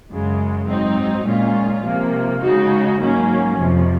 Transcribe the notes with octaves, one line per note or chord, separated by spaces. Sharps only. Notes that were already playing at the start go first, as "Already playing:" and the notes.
F#2 C#3 G#3
G#2 F#3 C4 D#4
A#2 G#3 C#4 F4
C3 F3 A#3
C#3 G#3 D#4 F#4
G#2 F#3 A#3 C#4
F2 C3 F3